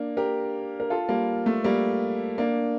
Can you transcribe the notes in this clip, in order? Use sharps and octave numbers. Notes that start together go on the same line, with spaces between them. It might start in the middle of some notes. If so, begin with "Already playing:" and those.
Already playing: A#3 D4
G4 A#4
A#4
F4 A4
G3 A#3
A3
G3 A#3
A#3 D4